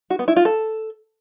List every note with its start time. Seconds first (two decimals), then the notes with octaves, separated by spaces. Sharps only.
0.10 F#4
0.19 B3
0.28 E4
0.36 F4
0.45 A4